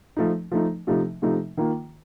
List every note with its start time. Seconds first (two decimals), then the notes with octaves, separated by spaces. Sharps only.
0.17 F3 A3 D#4
0.52 F3 A3 D#4
0.87 C3 F3 A3 D#4
1.22 C3 F3 A3 D#4
1.57 D#3 A#3 F4